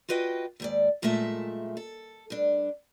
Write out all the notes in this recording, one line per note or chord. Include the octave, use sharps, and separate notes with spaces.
F4 F#4 B4 D#5 G5
D#2 G#2 D5
F#2 A#2 G#3 A3 E5 A5
A4
G2 D4